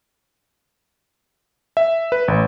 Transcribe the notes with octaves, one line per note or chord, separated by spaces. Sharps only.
E5
B4
A1